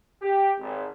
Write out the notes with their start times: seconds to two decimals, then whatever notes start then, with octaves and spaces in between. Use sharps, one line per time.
0.21 G4
0.58 G#1